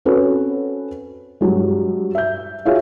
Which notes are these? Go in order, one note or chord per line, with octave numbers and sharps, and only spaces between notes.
C4 C#4 F#4 A4 B4 C#5
G2 F#3 G#3
E5 G6
F4 F#4 G#4 C#5 E5 F5